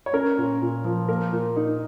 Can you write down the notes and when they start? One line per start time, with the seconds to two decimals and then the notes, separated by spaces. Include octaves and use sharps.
0.06 C#5
0.13 C#4 A#4
0.38 A#2
0.62 A#2
0.84 F3
1.08 A#3 A#4
1.32 A#2
1.56 D#4